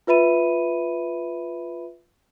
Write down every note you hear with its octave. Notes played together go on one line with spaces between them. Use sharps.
F4 B4 E5 B5 D#7